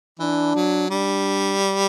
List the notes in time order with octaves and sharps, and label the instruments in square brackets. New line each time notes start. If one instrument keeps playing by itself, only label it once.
[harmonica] E3 [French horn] D4
[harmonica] F#3
[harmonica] G3 [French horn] D4